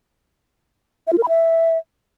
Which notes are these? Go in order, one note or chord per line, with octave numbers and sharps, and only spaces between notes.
E5
F4
A#4
B5
E5